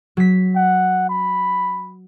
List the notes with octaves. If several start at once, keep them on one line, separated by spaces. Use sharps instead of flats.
F#3 B6
F#5
B5